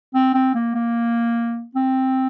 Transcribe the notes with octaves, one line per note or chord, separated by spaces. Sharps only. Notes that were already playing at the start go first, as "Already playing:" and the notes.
C4
C4
A#3
A#3
C4